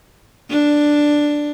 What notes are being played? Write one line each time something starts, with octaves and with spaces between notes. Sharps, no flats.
D4